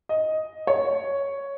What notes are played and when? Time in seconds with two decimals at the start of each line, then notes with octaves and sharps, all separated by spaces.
0.09 D#5
0.67 C#5